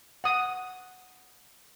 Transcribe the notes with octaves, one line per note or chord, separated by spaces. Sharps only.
F#5 D#6